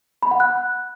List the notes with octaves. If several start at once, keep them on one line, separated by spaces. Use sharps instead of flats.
B5
F#5
F#6